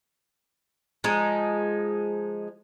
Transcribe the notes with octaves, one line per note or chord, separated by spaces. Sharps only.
F3 G#3 D#4